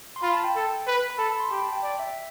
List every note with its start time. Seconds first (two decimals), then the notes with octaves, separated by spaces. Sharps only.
0.16 C6
0.23 F4 B5
0.33 A5
0.44 G5
0.55 A4
0.87 B4
1.10 B5
1.18 A4 A5
1.30 B5
1.40 C6
1.51 G4 B5
1.62 A5
1.72 G5
1.83 D5
1.99 E5